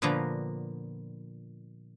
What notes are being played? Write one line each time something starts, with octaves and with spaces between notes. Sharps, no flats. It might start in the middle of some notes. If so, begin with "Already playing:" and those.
A#2 D3 F3 A#3 B3 A#5